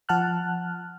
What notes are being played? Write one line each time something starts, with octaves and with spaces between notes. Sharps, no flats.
F3 F#5 A5 F6 F#6